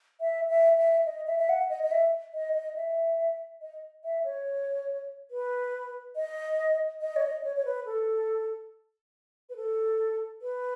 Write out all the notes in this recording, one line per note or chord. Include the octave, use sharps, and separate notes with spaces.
E5
E5
E5
D#5
E5
E5
F#5
D#5
D#5
E5
D#5
D#5
E5
D#5
E5
C#5
B4
D#5
D#5
C#5
D#5
C#5
C#5
B4
A4
B4
A4
B4